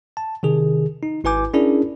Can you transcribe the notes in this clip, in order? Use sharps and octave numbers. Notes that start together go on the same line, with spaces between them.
A5
C3 D#3 G#4
D#4
G#1 E4 B4 G#5 D6 G6
C#4 D4 E4 G#4 A#4 D5